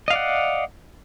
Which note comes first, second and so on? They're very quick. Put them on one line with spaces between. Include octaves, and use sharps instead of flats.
D#5 F5 D5 F#5